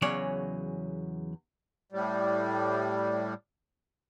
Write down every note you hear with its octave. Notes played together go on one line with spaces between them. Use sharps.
E2 C#3 F#3 C#4 C#5 D5
A2 G3